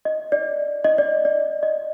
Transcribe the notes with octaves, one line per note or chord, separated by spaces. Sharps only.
D#5
D5
D#5
D5
D5
D#5